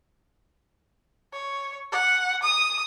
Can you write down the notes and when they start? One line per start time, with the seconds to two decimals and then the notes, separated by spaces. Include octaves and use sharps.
1.33 C#5
1.92 F#5
2.43 D#6